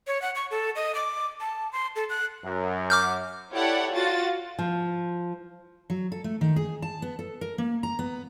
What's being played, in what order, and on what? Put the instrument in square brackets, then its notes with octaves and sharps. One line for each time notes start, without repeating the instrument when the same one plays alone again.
[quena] C#5
F#5
C#6
A4
D#5
D6
A5
C6
A4
F#6
[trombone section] F#2
[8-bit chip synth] D6 F6 G6
[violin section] E4 G4 A4 C#5 D5 F#5
F4 F#4 A6
[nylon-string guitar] F3
[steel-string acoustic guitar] F#3
A4
A3
D#3
G#4
A5
B3
A4
A#4
A#3
A#5
B3